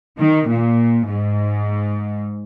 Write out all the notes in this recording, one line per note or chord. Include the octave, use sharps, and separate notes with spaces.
D#3
A#2
G#2